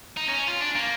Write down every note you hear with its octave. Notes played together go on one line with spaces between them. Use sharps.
D#4
C#4
F4
D4
A#3